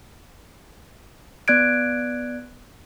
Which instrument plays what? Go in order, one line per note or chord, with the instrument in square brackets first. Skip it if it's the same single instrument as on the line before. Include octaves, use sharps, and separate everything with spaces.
[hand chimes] B3 D5 F#6 G#6 D7